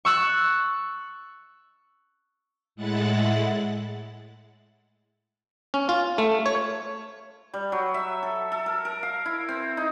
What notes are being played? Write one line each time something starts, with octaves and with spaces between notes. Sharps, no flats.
C#6 E6 F#6 A6
A2 G#3 E4 F#5 F#6 A6
C#4
F4
A3
C#5
G3
F#3
E5
A4
A4
A#4
A#4
F5
E4
C4
D#4